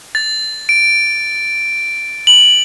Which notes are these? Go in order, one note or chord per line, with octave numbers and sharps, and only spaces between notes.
A6
D7
F#7